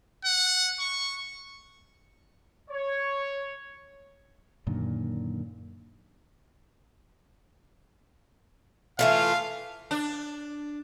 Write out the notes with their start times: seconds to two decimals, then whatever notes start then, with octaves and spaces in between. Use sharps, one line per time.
0.24 F#5
0.80 C#6
2.70 C#5
4.67 F#2 A#2 D3 D#3
8.99 E3 A3 F4 F5
9.91 D4